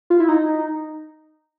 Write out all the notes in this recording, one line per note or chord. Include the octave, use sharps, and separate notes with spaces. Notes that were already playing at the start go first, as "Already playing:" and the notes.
F4
E4
D#4